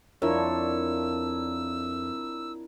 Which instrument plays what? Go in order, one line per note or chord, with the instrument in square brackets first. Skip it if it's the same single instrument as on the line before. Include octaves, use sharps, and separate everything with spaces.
[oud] F2 [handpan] D4 F4 C#5 [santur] E4 A#4 [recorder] E6